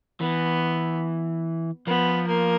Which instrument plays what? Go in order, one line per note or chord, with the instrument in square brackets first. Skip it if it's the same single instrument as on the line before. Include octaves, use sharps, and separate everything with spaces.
[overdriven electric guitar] E3 [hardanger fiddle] B3
[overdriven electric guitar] F3 [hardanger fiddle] B3
[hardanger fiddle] A#3